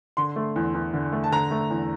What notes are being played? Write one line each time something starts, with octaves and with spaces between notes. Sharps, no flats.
D3 C6
A3
E2
E2
D3
A3
A5
D3 A#5
A3
E2